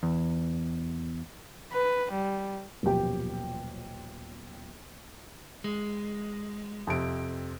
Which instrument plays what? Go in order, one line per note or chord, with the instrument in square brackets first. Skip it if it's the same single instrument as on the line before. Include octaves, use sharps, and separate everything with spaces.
[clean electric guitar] E2
[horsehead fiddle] B4
G3
[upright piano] D#1 F#2 B2 F3 G4 G5
[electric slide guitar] G#3
[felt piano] F2 C3 D7